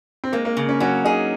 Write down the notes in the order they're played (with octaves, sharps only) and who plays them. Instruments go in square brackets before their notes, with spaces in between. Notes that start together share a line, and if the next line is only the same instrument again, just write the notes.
[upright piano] C4
[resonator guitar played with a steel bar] G#3 [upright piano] A#3
[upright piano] A#3
[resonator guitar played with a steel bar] C#3
[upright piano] C#4
[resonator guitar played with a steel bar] F#3 [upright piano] C#4
[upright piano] D#4 [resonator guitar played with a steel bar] G#4